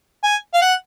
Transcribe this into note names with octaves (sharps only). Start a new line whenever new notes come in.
G#5
F5
F#5